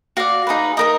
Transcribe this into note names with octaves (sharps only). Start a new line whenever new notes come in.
F#4 D5 F5
D#4 G#4 B4
D#4 A#4 D#5 D#6